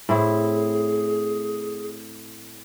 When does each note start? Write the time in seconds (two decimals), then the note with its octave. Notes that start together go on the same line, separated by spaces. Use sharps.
0.09 A2 C4 E4 G#4